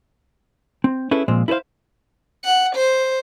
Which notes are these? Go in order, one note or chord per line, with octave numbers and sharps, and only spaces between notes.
C4
C#4 E4 G#4 A4 B4
A#2 F3 G#3 C4
E4 A4 B4 C5 F5
F#5
C5